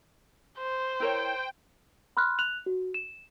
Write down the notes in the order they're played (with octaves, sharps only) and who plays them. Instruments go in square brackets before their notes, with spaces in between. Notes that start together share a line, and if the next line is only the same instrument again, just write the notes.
[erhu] C5
[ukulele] E4 A#4 C#5 [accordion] G5
[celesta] B5 C6 F6 F#6
F#6 F7 F#7
F#4
E7